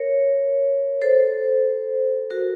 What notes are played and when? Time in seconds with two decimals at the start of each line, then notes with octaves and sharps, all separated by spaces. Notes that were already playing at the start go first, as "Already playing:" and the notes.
Already playing: A#4 C#5
1.02 A4 C5
2.30 F#4 A#4